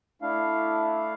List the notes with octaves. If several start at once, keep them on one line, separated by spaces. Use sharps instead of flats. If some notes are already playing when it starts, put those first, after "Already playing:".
A3 D4 E4 F5